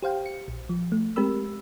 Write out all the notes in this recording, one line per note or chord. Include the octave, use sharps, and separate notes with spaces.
G4 C5 F5 G5
C#7
A#1
F3
A3
G#3 C4 G4 A#4 B5 E6